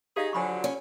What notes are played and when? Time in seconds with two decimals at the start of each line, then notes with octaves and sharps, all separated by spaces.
0.16 D#4 G4 G#4 D5 F5
0.33 D3 F3 F#3 G#5 B5 C#6
0.64 C#4